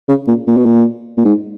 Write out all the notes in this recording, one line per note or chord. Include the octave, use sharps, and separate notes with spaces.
C#3
A#2
A#2
B2
A#2
A#2
G#2